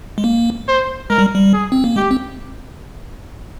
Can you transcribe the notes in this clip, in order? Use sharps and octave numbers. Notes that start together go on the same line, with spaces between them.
G#3
A#3
C5
G#3 A#4
G3
G3
G#4
C4
A#3
G#3 G4
C4